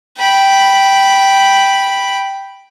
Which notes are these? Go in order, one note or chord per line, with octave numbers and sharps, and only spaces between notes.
G5 B5